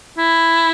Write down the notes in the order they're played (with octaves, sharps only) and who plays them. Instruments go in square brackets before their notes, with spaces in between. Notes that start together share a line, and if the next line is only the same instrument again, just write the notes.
[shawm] E4